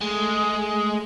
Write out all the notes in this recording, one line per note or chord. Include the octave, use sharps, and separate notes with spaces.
G#3 A3